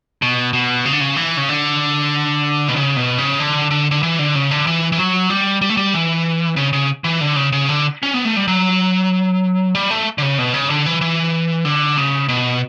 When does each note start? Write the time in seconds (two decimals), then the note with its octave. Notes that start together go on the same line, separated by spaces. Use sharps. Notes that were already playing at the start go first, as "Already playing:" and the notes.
0.22 B2
0.53 B2
0.85 C#3
0.93 D3
1.01 C#3
1.16 E3
1.37 C#3
1.49 D3
2.68 B2
2.76 C#3
2.97 B2
3.18 C#3
3.40 D3
3.71 D3
3.91 D3
4.03 E3
4.19 D3
4.35 C#3
4.51 D3
4.67 E3
4.92 E3
4.98 F#3
5.30 G3
5.62 G3
5.70 A3
5.77 G3
5.93 E3
6.56 C#3
6.73 C#3
7.04 E3
7.21 D3
7.36 C#3
7.52 C#3
7.69 D3
8.03 C#4
8.14 B3
8.25 A3
8.36 G3
8.48 F#3
9.75 G3
9.91 A3
10.18 D3
10.22 C#3
10.38 B2
10.54 C#3
10.70 D3
10.86 E3
11.01 E3
11.65 D3
11.97 C#3
12.29 B2